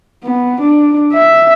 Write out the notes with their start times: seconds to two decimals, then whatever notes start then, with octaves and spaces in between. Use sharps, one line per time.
0.23 B3
0.61 D4
1.12 E5